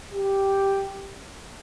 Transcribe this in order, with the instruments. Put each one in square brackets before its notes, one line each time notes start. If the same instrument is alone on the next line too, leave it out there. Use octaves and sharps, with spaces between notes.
[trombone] G4